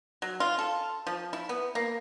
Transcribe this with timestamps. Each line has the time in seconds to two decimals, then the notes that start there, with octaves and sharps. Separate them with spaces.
0.22 F#3
0.40 F4
0.59 A4
1.07 F3
1.33 E4
1.49 B3
1.75 A#3